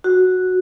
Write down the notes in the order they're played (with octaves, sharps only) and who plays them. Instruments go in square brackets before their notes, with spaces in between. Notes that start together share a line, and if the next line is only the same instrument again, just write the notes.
[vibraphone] F#4